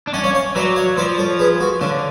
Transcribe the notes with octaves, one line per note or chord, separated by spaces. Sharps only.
D4
C#4 D5 F#5
C#5 F5
C#5 F5
F#3 B4 D5
C#5 F5
F3 B4 D5
A4 C#5
G#4 B4
F#4 A4
D3 C#4 F4